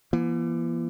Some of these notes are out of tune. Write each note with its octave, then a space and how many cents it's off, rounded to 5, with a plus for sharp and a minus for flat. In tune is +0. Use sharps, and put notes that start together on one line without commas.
E3 +35 A#3 +45